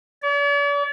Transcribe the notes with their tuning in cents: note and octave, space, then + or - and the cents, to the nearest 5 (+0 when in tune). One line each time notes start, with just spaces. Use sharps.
D5 -45